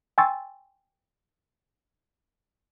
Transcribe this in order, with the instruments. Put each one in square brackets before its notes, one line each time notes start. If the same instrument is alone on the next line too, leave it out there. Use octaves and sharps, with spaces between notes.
[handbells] G5 G#5 C6 C#6 E6 A6